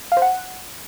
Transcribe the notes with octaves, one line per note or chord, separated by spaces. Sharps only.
F5
C5
F#5